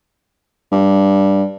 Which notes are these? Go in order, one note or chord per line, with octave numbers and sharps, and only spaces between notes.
G2